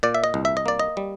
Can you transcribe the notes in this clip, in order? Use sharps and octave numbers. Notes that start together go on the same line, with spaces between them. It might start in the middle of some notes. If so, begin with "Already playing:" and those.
A#2 D5
E5
D#5
C2
E5
D#5
A#3 D5
D#5
G3